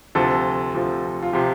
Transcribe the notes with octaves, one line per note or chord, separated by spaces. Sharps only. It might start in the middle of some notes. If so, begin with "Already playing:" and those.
D2 C3 F3 A4
D2 C3 F3
F4
C3 F3 G4